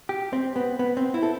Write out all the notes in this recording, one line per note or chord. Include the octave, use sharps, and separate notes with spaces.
G4
C4
B3
B3
C4
E4
A4